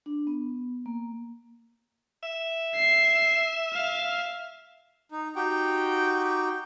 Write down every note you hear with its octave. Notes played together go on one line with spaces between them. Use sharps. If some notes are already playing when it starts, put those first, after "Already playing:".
D4
B3
A#3
E5
C7
F5
D#4
D#4 F#4 G4 G5